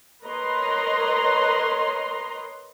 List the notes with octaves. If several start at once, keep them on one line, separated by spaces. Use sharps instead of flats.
A#4 B4 C#5 D#5 A#5 C6